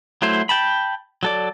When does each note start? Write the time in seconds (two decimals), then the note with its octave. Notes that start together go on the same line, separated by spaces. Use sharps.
0.22 F#3 A3 E4 C5
0.49 G5 A5 B5
1.23 F#3 A4 D5